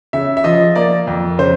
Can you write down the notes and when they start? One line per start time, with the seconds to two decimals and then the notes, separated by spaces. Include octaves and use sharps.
0.13 C#3 E5
0.37 E5
0.44 F3 D#5
0.76 A#3 D5
1.07 F2
1.38 C#3 C5